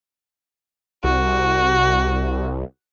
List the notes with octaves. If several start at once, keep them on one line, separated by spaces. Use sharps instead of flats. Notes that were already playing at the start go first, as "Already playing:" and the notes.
C2 F#4